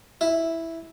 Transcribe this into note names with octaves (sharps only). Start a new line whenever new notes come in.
E4